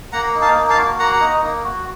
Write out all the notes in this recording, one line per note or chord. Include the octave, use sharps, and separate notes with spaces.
A#3 F#5 A#5
D#4
F5 A5
A#3
F5 A5
F#4
A#3 F#5 A#5
D#4
A#3
F#4